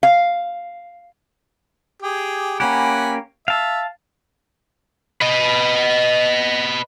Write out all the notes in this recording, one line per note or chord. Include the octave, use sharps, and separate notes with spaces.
F5
G4 G#4
A#3 C#4 G4 F#5 G#5 B5
E5 F5 A5
B4 D#5